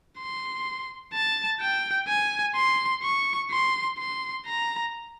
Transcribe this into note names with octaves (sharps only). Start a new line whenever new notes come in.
C6
A5
G5
G#5
C6
C#6
C6
C6
A#5